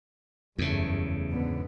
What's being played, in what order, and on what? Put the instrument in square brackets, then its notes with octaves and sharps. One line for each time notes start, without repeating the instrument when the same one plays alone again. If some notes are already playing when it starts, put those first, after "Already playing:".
[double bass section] F#1 G2 A3 [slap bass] E2 C#3
[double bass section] G#2 D3 B3